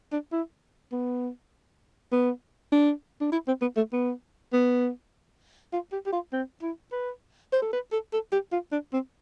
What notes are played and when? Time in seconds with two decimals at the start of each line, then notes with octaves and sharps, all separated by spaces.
0.12 D4
0.33 E4
0.92 B3
2.12 B3
2.72 D4
3.21 D4
3.32 E4
3.48 C4
3.62 B3
3.77 A3
3.93 B3
4.53 B3
5.73 F4
5.92 G4
6.06 G4
6.13 F4
6.33 C4
6.62 E4
6.92 B4
7.53 C5
7.62 A4
7.73 B4
7.92 A4
8.13 A4
8.32 G4
8.52 F4
8.72 D4
8.93 C4